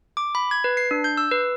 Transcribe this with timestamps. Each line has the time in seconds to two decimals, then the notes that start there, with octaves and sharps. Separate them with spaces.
0.17 D6
0.35 B5
0.51 G#6
0.64 B4
0.77 C7
0.91 D4
1.04 G6
1.17 E6
1.32 B4